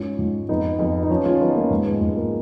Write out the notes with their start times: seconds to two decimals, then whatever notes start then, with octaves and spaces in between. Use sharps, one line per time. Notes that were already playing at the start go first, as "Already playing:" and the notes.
Already playing: G#2 C#4 F4
0.19 G#2
0.49 F2 B3 D#4
0.79 F2 B3 D#4
1.03 D#4
1.09 F3 C#4 F4
1.25 C#4 F4
1.40 F3 B3 D#4
1.55 A#3 C#4
1.71 G#2
1.86 G#3 B3
2.01 G#2 G#3 B3
2.16 A#3